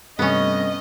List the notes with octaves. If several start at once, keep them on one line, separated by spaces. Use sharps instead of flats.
G2 C3 A3 B3 C#4 D#5